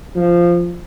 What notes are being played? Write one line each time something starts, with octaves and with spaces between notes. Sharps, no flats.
F3